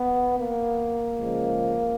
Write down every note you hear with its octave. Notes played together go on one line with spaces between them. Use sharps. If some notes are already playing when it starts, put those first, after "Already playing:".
Already playing: B3
A#3
C#3 F3 G#3